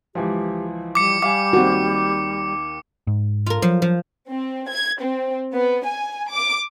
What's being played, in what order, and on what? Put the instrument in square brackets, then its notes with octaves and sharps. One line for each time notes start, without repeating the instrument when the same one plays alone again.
[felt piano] C#2 E3 F3 [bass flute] G4
[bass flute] G3 [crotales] D6 C#7
[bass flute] G3 [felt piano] F5 G#5 [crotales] D6
[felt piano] D#2 D#3 [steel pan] C4 F#4
[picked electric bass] G#2
[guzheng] F4 A#4
[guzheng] F3 [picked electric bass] F#3
[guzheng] F3
[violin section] C4
G#6
C4
B3
G#5
D6